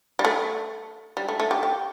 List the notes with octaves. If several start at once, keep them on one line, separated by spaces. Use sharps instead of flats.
G3
A3
G3
A3
A3
G4
G4